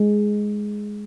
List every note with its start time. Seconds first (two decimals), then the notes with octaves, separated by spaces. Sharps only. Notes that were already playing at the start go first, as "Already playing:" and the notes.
Already playing: G#3